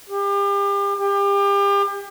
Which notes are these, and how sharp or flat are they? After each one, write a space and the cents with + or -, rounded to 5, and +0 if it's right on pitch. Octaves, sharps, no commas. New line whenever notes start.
G4 +35
G4 +35